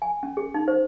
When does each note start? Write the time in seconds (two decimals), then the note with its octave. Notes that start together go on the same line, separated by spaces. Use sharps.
0.02 G#5
0.23 C#4
0.37 G#4
0.54 D#4
0.68 C5